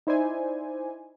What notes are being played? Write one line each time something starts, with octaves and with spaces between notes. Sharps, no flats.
D#4 E4 C5 D5 G#5